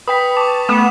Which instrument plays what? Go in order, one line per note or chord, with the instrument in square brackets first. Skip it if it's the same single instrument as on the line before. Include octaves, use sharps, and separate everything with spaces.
[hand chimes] B4 G5 [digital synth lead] B5 [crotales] D#6 B6
[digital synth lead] A5 [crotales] C#6 D6
[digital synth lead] A3 [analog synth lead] B3 [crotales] E7